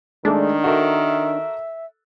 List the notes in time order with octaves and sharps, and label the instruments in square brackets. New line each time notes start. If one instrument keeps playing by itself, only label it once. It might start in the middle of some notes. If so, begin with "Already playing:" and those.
[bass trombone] D#3 [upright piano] G#3 A3 [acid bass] D4
[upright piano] F#4 A4 A#4 [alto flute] E5